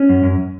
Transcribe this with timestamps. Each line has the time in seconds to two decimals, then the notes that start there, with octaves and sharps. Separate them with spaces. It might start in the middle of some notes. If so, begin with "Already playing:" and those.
Already playing: C#4
0.09 F#2
0.23 F#2